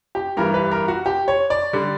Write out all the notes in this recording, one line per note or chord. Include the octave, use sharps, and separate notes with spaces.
G4
G2 E3 G3 A#4
B4
A#4
F#4
G4
C#5
D5
D3 G3